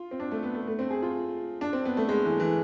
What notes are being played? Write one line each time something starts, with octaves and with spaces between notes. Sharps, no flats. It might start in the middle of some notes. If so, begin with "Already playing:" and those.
Already playing: F4
C4
D4
A3
B3
A3
A3
C4
G#4
F4
D4
C4
B3
A3
G#3
E3
E3